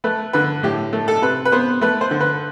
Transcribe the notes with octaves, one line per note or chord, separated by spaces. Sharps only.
A3 B4
D3 B4
A2 G4
A3
A4
C3 B4
B4
B3 C5
A3 B4
C5
D3
B4